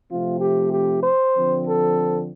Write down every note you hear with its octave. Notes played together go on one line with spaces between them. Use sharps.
C3 F3 A3 C4 F4
G4
G4
C5
D3 F3 C4
A4